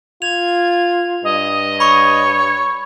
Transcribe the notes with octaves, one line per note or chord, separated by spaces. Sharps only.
F4 G#6 F7
G2 D#5
C#5 B5 C#6